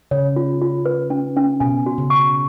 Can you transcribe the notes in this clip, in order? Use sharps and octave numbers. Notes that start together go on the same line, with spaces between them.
C#3 C#5
F4
F4
B4
C#4
C#4
B2 G#5
F#4
C#3
C#6